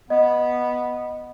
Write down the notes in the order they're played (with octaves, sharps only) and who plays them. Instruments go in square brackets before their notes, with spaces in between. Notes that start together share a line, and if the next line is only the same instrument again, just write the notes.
[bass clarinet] B3 [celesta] D#5